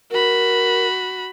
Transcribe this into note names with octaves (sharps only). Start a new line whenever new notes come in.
F#4 A#4 B5